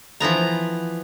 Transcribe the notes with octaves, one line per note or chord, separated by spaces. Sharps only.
E3 F3 B3 A#5